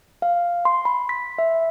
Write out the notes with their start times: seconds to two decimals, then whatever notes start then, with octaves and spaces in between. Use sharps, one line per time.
0.22 F5
0.65 C6
0.85 B5
1.09 B6
1.38 E5